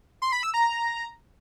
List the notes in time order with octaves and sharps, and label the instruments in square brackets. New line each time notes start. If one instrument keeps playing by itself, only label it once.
[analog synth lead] C6
B5
E6
A#5